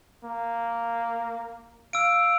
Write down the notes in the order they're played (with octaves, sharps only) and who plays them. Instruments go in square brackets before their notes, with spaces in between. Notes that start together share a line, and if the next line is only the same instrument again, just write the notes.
[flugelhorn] A#3
[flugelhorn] F5 [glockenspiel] E6 D7